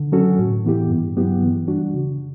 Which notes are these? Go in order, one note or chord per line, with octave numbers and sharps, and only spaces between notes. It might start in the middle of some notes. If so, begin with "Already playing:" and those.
Already playing: D3
F#3 C#4 F#4 A4
A2
E3 B3 E4 G4
G2
F#3 B3 E4 G4
E3
G3 D4 F#4
C#3